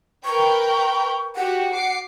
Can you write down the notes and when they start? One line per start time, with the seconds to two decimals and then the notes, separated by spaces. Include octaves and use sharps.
0.25 A#4 B4 G5 C#6
1.36 F#4 G4 F#5
1.73 D6 C7